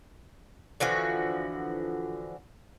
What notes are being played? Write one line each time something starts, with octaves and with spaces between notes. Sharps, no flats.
D3 E3 F3 F#4